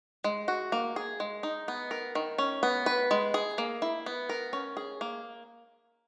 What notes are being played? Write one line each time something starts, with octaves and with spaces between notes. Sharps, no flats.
G#3
F#4
A#3
G#4
G#3
D#4
B3
A#4
D#3
C#4
B3
B4
G#3
G#4
A#3
E4
B3
A#4
C#4
G#4
A#3